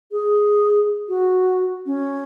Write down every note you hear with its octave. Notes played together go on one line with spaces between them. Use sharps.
G#4
F#4
C#4